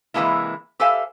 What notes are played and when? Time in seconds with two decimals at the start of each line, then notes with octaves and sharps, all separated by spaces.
0.14 C3 E3 F3 G#3 A#3 E4
0.80 G4 A4 C5 E5 F5 G#5